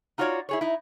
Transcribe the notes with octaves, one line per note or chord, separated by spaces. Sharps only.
D#4 F4 F#4 A#4 C#5 D5
E4 G#4 C#5
D#4 E4